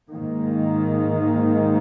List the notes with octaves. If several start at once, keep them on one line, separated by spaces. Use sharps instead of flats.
G#2 D#3 A#3